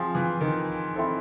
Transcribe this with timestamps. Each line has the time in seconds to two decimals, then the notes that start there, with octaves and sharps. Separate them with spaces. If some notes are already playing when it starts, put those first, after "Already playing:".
Already playing: F3 C4 F4 G#4
0.15 E3
0.41 D#3
0.95 C4 E4 A4 C5